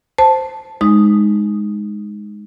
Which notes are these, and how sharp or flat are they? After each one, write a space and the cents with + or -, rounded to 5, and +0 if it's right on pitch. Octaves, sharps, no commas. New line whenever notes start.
C5 +0 A5 +0
G#3 +0 D#4 +0 D#6 +0